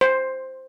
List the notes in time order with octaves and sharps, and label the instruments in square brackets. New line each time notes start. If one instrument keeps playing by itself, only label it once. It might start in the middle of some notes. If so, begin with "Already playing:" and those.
[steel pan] C5